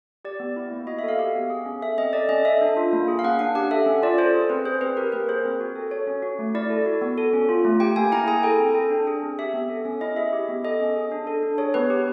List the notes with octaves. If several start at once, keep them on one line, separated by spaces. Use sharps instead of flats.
G4 D5
B3
E4
A#3
F#4 D#5
E5
A4 F5
G4 F5
B3
G#4
C#4
A4 E5
C4 D#5
A4 D5
C#4 D#5
A4 E5
D4
F4
A#3
G#4
F5
C#4 F#5
D4 F#5
G4 F#5
A4 E5
C#4
F4 D5
A4 C5
G#4
C4 B4
G#4 C5
C4 B4
G4 A#4
A#3 B4
G#4 C5
C4
F#4
A4
A4 C#5
C#4
F#4
A3
E4 D5
A4
F#4
B3
A4
C#4
F4
A3
G4 G5
A#3 G#5
E4 A#5
G#4 G#5
A4 G5
C4
A4
D4
G#4
C4
G4 E5
B3
A4
C#4
E4 D#5
G#4 E5
G4
B3
A4 D#5
C#4
G#4
D4
A4
D4
G#4 C#5
B3 B4
G4